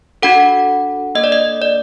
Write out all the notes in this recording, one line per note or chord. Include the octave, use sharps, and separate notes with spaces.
D4 F#4 A4 F#5
A#3 D4 A4 D#5
D5
D#5
D5